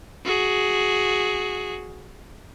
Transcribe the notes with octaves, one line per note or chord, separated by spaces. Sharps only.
F#4 G#4